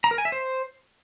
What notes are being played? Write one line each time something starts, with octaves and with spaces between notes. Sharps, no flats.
A#5
A#4
G#5
E5
C5